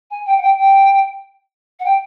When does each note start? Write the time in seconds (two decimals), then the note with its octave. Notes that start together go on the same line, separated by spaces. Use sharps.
0.11 G#5
0.26 G5
0.37 F#5
0.41 G5
0.57 G5
1.79 F#5
1.85 G5